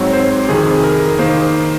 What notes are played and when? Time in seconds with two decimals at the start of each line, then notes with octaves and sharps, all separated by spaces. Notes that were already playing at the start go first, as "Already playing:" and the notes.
Already playing: G#2 F#3 C4 C#5
0.13 C5
0.49 F2 C3 D#3 G#4
0.84 A#4
1.19 D#3 A#3 C5